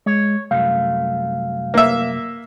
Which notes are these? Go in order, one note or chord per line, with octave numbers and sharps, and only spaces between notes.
G#3 C#5
C2 F#2 A3 F5
A#3 E5